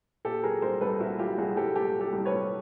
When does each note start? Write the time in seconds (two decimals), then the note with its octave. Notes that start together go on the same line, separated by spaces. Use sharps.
0.25 A#2 G4 A4
0.43 F#3 G#4 A#4
0.62 C2 A#4 C5
0.81 C2 A4 B4
1.00 A#2 E4 F#4
1.19 F#3 F4 G4
1.38 C2 F#4 G#4
1.57 C2 G4 A4
1.75 A#2 G4 A4
1.95 F#3
2.00 G4 A4
2.13 C2
2.25 B4 C#5
2.32 C2